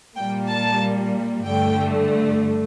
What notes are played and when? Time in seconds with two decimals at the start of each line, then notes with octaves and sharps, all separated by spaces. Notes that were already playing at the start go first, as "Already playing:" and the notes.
0.16 A#2 G3 A#3 G5
0.48 A5
1.45 G2 D3 A3 G5